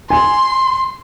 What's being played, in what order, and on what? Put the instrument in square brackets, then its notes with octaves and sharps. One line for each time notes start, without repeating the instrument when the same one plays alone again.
[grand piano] G#5 [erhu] C6